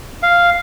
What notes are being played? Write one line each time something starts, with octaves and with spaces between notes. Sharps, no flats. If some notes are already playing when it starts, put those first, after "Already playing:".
F5